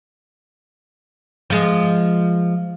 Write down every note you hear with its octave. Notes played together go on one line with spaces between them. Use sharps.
F3 G#3